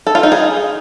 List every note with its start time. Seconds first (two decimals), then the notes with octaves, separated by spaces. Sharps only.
0.07 A4
0.15 F4
0.23 D#4
0.32 G#4